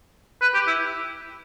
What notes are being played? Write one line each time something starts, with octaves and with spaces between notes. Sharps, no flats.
B4
G4
E4